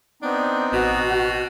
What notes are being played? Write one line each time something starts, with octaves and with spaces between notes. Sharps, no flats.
B3 C4 D4 D#4
A1 B2 F#4